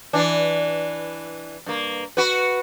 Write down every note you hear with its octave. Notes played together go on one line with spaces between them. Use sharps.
E3 D4
G2 A#3
F#4 B4